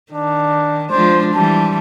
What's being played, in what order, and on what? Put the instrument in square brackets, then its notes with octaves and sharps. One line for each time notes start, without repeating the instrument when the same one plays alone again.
[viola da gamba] D#3 [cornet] D4
[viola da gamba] F3 G#3 D4 [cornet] C5
[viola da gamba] E3 G3 [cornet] A5